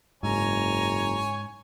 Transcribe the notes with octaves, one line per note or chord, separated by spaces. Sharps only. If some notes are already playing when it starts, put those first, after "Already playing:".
F#1 G#2 C#5 G#5 A#5